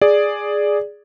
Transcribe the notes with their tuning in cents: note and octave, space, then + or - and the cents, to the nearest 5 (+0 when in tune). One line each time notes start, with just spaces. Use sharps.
G#4 +0 D5 +0